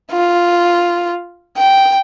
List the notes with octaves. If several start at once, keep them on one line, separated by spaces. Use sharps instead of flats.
F4
G5